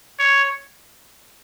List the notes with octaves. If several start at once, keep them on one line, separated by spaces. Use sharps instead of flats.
C#5